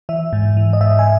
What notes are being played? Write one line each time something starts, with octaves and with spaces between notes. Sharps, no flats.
E3 E5
G#2
E3
D#5
G#2 E5
G#5